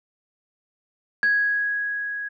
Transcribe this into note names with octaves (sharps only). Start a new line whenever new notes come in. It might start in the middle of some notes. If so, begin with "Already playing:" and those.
G#6